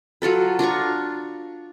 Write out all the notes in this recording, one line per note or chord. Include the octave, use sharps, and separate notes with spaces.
F#3 F4 A4 B4
D4 F4 A#5 C#6